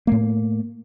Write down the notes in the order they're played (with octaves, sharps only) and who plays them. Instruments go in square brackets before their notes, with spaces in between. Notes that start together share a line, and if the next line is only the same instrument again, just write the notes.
[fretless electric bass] A2 A3 A#3